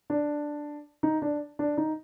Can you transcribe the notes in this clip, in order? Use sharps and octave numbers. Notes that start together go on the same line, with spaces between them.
D4
D#4
D4
D4
D#4